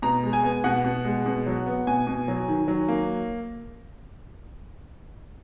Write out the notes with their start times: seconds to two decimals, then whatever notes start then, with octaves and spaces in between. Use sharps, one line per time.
0.02 B2 A#5
0.23 G#3
0.33 G#5
0.43 B3
0.64 B2 F#5
0.84 B2
1.05 G#3
1.26 B2
1.46 F#3
1.66 B3
1.87 B2 G#5
2.07 B2
2.28 F#3
2.48 D#3
2.68 F#3
2.88 A#3